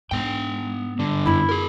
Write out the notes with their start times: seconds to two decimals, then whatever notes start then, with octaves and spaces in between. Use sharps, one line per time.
0.11 G#2 B3 G5
0.99 G2 D3
1.26 F#2 B3 E4
1.49 G#4 A#4